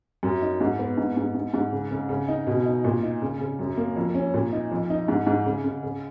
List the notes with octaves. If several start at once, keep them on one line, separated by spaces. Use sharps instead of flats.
F#2
D#4
G#2
B3
G#2
G#2
G#2
G#2
C#3
C#3
C#3
D#4
B2
D#4
A#2
D#4
C#3
C#3
F#2
A#3
F2
C#4
A#2
D#4
F2
D#4
G#2
G#2
C#3
C#3
C#3